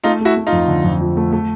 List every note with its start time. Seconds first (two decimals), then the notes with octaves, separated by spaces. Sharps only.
0.04 A3 D#4 F4
0.21 A3 E4 F#4
0.37 A3
0.47 D#4 F4
0.52 F2
0.68 D3
0.84 F2
1.01 F3
1.17 A3
1.32 A3